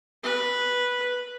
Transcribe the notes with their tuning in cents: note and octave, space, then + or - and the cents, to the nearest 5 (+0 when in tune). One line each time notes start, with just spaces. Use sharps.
B4 -5